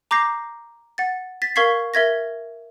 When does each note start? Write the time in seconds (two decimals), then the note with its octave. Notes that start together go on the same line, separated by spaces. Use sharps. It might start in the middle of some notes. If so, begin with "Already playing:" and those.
0.11 A#5 D6 G6 A#6 C7
0.98 F#5 A6
1.42 A6 B6
1.56 A#4 F5 C#6 G#6 B6 C7
1.94 A#4 E5 G#6 A#6